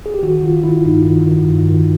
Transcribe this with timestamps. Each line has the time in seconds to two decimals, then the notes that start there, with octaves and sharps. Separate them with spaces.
0.06 G#4
0.14 G4
0.23 D#3 F#4
0.43 D#3 F4
0.64 D#3 E4
0.85 G2 D#4
1.05 D#3
1.26 D#3
1.47 G2
1.68 D#3